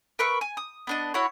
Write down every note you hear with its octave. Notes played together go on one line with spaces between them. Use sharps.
A#4 B4 E5 C#6
G#5
D#6
B3 D4 D#5
E4 F#4 C#5